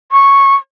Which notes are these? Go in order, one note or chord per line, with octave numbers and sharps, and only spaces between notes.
C#6